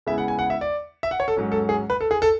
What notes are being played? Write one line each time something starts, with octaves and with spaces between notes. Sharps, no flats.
C#3 G#3 B3 E4 E5
F#5
G#5
F#5
E5
D5
E5
F#5
C#5
A4
G#2 F#3 C#4
A4
G#4
B4
A4
G#4
A4